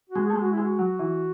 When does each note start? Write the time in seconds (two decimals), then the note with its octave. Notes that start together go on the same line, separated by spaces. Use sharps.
0.09 F#4
0.16 G#3
0.26 A3 G#4
0.36 G#3
0.41 F#4
0.52 E4
0.57 G#3
0.63 F#4
0.79 F#3
0.99 E3